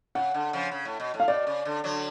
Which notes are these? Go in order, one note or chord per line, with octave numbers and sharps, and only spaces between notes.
C#3 F#5
D3
C#3 F3
C#3
A2
B2
A2
F5
B2 D5
C#3
D3
D3 F#3